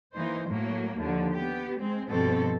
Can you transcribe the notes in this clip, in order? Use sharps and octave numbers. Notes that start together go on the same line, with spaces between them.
E3 A#3 D#4 C5
A2 F#3 A#3
D#2 D3 F3
B3 G4
G#3 C4
G2 B2 F3 C4 A4